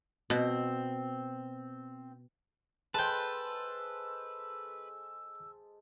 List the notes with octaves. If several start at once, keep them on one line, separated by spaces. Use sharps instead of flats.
B2 C4
G#3 A4 B4 C5 G5 A5 E6